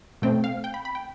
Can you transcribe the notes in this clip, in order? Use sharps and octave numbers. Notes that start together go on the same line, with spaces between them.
B2 A3 C4 G5
F5
G5
B5
B5
G5